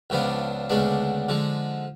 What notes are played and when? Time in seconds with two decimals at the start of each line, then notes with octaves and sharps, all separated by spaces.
0.10 C#2 C#3 F3 B3 D4
0.70 D2 C#3 G#3 B3 D4
1.29 D3 F3 G#3